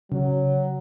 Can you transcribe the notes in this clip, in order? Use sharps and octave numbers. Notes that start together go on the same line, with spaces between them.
C#3 F#3